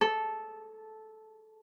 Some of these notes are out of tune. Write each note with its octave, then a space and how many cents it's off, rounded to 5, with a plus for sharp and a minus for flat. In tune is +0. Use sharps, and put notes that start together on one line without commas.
A4 -10